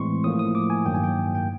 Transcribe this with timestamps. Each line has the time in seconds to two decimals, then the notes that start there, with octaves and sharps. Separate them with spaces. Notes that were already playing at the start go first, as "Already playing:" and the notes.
Already playing: A2 E3 G#3 C4 C6 C#6
0.24 A2 F3 A#3 D#6
0.39 D#6
0.55 D6
0.70 G#5
0.86 G2 D#3 F#3 A#3 G5
0.94 G#5
1.04 G5
1.35 G5